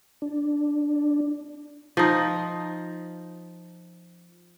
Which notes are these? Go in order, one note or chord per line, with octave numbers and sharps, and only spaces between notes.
D4
F3 D#4